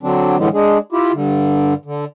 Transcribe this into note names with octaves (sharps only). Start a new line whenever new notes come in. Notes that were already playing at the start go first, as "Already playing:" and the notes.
D3 F#3 C4 D4
A2 D3 E3 G3 G#3
G#3 D4 G#4
E4 F4 G4
G2 D3
D3